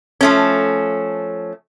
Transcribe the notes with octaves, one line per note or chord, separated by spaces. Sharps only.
F3 A3 C#4